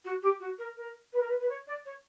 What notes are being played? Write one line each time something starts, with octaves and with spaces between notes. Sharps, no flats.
F#4
G4
F#4
A#4
A#4
B4
A#4
B4
B4
C#5
D5
C#5